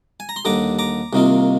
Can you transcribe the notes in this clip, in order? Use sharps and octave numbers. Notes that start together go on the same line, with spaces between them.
G#5
A#5
C6
D#2 D3 G3 A#5 D6
A#5 D6
C2 C3 D#3 A#3 F4